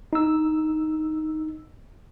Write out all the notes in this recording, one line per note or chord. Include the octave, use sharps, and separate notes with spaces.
D#4 E6